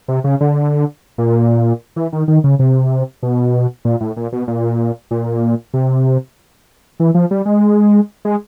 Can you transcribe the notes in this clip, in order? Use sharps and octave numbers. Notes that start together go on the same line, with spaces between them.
C3
C#3
D3
A#2
E3
D#3
D#3
C#3
C3
B2
A#2
A2
A#2
B2
A#2
A#2
C3
E3
F3
G3
G#3
G#3